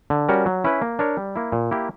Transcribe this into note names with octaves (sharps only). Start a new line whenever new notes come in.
D3
G3 C#4 F#4 A#4
F#3
C#4 E4 B4
A#3
D4 A#4 C#5
G3
A#3 E4
A#2
A#3 E4 G4